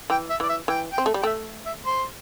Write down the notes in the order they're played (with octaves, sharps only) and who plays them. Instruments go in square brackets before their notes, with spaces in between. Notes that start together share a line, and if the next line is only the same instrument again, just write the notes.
[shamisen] E3 [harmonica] G5
[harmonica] E5
[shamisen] E3 [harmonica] D5
[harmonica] E5
[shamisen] E3 [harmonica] G5
[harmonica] G5
[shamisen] C4
A3
G3
[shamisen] A3 [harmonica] E5 G5
[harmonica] E5
C5